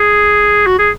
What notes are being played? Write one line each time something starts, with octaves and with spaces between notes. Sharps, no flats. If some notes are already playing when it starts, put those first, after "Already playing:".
Already playing: G#4
F#4
G#4